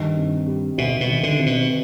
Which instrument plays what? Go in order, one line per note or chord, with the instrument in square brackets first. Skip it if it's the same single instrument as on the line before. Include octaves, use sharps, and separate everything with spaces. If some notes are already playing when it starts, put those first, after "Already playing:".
Already playing: [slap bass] G2 [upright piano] D#3
[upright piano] C3
G3
[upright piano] D2 [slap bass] B2
[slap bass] B2
[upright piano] D#3
[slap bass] D3
[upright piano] C3
[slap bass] B2